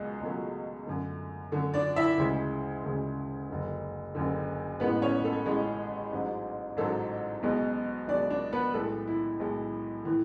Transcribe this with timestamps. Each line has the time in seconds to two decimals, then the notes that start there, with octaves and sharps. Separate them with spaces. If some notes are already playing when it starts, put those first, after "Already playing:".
Already playing: C#2 B2 F#3 G#3 G#4
0.21 C#2 B2 F#3 A3
0.87 F#2 D3 A3
1.52 F#2 D3 A3
1.74 D4 D5
1.96 E4 E5
2.18 D2 C#3 G#3
2.84 D2 C#3 G#3
3.49 F#1 F#2 D3
4.15 F#1 F#2 D3
4.80 A1 A2 G#3 B3 B4
5.02 C#4 C#5
5.24 A3 A4
5.46 A1 A2 G#3 G#4
6.12 A1 G#2 F#3
6.77 A1 G#2 F#3 A3 A4
7.43 B1 B2 G#3
8.08 B1 B2 G#3 D4 D5
8.30 D4 D5
8.52 B3 B4
8.74 B1 A2 G#3 A3 A4
9.07 E4
9.40 B1 A2 G#3
10.05 A2 E3